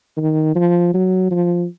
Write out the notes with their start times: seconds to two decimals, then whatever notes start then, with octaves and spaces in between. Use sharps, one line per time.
0.17 D#3
0.56 F3
0.94 F#3
1.31 F3